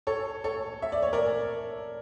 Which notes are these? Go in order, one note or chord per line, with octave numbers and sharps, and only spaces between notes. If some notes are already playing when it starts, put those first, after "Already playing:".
A4 C#5
A4 C#5
E5
D5
C#5
A#4 D5